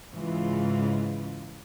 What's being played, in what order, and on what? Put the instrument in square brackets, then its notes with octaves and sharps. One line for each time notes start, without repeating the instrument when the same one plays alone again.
[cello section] G#2 C#3 E3 G#3 F4